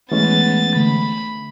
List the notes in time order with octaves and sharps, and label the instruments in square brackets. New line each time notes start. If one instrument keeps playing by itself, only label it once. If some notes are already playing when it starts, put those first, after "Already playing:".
[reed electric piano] E3 G#3 C#4 [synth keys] A3 [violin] B3 A6
[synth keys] D3 A3 [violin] B5